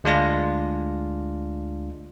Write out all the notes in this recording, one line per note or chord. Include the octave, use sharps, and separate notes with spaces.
D2 G#3 D4 F4 A#6